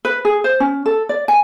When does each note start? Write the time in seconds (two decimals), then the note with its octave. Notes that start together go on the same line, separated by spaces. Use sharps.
0.05 B4
0.25 G#4
0.44 C5
0.60 C#4
0.86 A4
1.09 D5
1.28 G#5